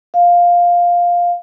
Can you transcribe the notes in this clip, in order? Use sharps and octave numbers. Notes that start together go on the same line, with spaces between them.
F5